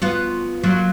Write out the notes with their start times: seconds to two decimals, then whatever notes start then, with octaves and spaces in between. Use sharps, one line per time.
0.02 B3 F4 F#4
0.63 F#3 A#3 F4